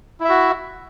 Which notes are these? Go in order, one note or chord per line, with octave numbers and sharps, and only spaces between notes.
E4 F#4 E5